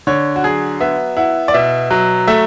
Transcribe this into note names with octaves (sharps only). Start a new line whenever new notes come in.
D3 C#5
F#4
F#3 G#4
B3 E5
E4 F#5
D5
B2 E5
F#3
A3 E5